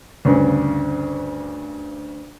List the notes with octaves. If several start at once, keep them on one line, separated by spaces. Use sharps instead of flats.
D2 G2 C#3